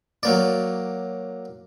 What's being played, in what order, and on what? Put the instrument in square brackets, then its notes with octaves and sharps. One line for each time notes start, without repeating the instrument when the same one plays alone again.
[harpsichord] F#3 A#3 D5